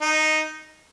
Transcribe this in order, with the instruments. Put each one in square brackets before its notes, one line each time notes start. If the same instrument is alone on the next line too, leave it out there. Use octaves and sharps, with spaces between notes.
[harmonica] D#4